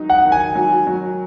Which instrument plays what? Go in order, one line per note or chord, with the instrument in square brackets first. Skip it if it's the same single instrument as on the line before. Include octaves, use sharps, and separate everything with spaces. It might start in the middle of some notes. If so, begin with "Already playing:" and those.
Already playing: [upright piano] D#3 F#3 D#4
[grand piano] F#5
[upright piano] D#3
[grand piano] G#5
[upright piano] F#3
F#3